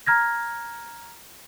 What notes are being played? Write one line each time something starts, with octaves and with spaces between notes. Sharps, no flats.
A#5 F6 G#6 A#6